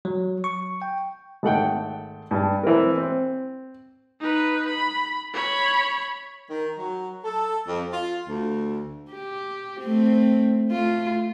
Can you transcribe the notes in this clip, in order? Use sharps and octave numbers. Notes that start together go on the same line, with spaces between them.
F#3
C#6
G5
G#1 A3 F#5 G5
G2 A5
E3 C4 A#4
C4
D#4 B4
B5
C#5 B5
D#3
F#3
A4
F2
F4
D2
G4
A3 C4
A3 F4